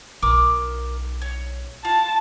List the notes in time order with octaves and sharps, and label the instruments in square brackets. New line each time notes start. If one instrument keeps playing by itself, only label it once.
[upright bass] B1 [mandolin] A#4 D6 D#6
[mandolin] C#5
[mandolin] F4 [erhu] A5